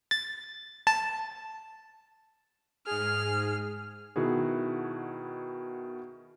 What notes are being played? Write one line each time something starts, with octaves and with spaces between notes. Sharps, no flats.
A6
A5
G#2 G#4 F6
B2 D#3 E4 F#4 G#4